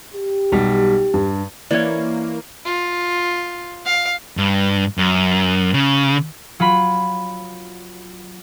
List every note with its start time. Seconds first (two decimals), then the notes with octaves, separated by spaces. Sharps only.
0.14 G4
0.52 B1 G3
1.14 G2
1.71 E3 A#3 C#4 C#5 D5
2.65 F4
3.85 F5
4.37 G2
4.98 F#2
5.74 C#3
6.60 F#3 F4 B5